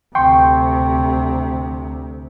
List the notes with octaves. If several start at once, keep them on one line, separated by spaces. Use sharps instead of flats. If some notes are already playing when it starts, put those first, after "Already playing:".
D2 C3 G5 C6 C#6